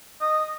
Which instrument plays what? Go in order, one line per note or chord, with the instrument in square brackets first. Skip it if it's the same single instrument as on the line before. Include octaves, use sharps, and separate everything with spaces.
[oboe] D#5